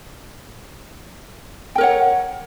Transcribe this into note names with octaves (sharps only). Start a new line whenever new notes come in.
A#4 C#5 F#5 G5